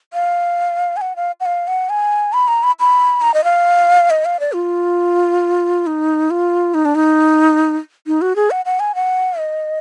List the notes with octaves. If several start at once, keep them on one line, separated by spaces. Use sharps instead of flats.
F5
G#5
F#5
F5
F#5
F5
F#5
G#5
B5
A#5
B5
B5
A#5
D#5
F5
D#5
F5
D5
F4
D#4
F4
D#4
D4
D#4
D#4
F#4
G#4
F#5
F#5
G#5
F#5
D#5